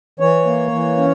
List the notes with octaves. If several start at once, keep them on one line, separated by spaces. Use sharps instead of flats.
E3 C#5
A#3
E3
C#4